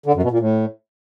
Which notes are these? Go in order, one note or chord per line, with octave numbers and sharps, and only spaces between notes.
D3
F#2
B2
A#2
A2